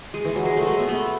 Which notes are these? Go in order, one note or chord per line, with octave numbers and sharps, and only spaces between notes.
G#3
E3
F#3
G#3
A3
F#3 G#3
B3
A3